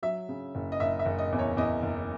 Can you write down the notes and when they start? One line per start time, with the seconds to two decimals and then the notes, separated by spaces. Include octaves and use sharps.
0.03 F#3 E5
0.29 C#3
0.55 F#1
0.72 D#5
0.80 F#1 E5
0.99 E5
1.06 F#1
1.19 D#5
1.32 E2
1.39 C#5
1.57 E2 D#5
1.83 F#1